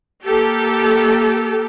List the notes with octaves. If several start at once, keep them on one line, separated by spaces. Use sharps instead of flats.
A#3 G4 A4